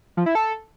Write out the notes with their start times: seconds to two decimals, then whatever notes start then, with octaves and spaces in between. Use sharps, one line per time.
0.17 F3
0.26 E4
0.35 A4